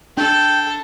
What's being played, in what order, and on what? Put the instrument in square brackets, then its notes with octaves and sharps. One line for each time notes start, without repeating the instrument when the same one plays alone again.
[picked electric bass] D4 [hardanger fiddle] A4 [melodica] G5